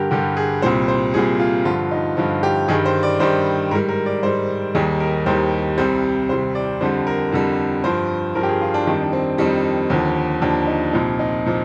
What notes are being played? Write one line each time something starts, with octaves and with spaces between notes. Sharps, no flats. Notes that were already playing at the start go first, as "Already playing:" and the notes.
Already playing: G2 D3 G3 G4 A#4
G2 D3 G3 G4
G#4
C2 A#2 G3 C5
C5
C2 A#2 G3 G#4
F4
G2 D3 F3 F4
D#4
G2 D3 F3 F4
G4
G2 D#3 G3 G#4
C5
D5
G2 D#3 G3 C5
G#2 G3 A#4
A#4
D5
G#2 G3 C5
D#2 D#3 G3 G#4
A#4
D#2 D#3 G3 C5
C2 C3 G3 C5
C2 C3 G3 C5
D5
F2 D3 G3 C5
A#4
F2 D3 G3
G2 F3 C5
G2 F3 A#4
G4
G#4
F4
D4
F2 D#3 G3 D4
D4
C4
F2 D#3 G3
D#2 D3 F3
D#2 D3 F3 D4
D#4
C2 A#2 F3 D#4
D#4
A#2 F3